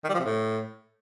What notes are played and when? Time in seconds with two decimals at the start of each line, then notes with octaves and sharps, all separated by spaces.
0.04 D#3
0.09 G3
0.14 F3
0.19 C3
0.25 A2